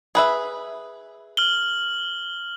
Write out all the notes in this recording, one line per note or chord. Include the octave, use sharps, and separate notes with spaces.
G#4 B4 E5
F6 F#7 G7